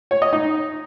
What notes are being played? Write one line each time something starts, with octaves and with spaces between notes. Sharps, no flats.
C#5
D#5
D#4